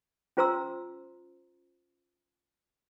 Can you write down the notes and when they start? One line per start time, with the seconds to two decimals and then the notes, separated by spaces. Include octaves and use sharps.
0.37 C#4 F4 C5 A#5 C6 E6